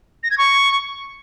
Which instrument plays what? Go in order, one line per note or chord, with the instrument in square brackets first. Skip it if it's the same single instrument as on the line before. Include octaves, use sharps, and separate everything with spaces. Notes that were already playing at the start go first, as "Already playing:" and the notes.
[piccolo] A#6
G#6
C#6